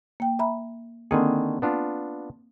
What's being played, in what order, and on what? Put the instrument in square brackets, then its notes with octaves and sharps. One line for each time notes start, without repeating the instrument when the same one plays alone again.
[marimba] A#3 G5
E5 A#5 B5
[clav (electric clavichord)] D3 D#3 G#4 [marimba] A#3 C4
[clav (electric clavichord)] B3 D4 F4